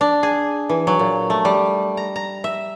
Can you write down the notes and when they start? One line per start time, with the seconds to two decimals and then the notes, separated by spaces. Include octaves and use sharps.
0.01 D4
0.23 G#4
0.69 E3
0.87 F#3
0.99 A#2
1.30 A3
1.45 G3
1.97 A#5
2.16 A#5
2.44 E5